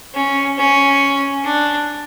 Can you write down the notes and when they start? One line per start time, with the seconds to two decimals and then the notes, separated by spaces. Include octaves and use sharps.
0.15 C#4
0.58 C#4
1.44 D4